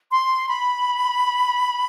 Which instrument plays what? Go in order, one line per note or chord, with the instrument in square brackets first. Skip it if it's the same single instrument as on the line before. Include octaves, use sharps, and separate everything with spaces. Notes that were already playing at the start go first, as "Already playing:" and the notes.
[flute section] C6
B5